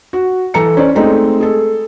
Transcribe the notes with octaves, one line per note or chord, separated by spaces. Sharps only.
F#4
E3 A4 A#5 C#7
C#4 C5 D5
G#3 A3 C4 D#4
G#4 A4